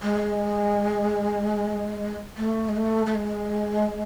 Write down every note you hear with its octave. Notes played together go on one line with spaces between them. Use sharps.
G#3
A3
G#3
A3
A3
G#3